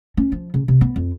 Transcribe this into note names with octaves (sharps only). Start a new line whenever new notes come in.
C#4
F3
C#3
C3
B3
F2